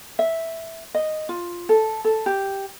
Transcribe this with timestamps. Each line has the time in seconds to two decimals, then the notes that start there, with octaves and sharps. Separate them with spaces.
0.19 E5
0.94 D#5
1.29 F4
1.69 A4
2.04 A4
2.26 G4